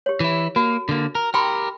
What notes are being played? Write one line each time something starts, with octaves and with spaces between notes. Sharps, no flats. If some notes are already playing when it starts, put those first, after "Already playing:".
G4 C#5
E3 E4
A#3 F#4
D3 A#3
A#4
G4 A#4 G5 B5 C6